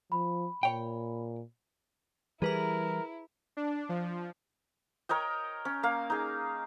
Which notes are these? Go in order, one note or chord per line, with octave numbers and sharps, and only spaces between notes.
F3 B5
A#2 C#5 G5
E3 G3 E4 G#4 A#4 B4 A#5
D4
F3
A#4 C#5 D#5 G5
C#4
A#3 F5
D#4 G#4